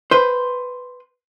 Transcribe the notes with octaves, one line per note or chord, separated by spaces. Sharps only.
B4 C5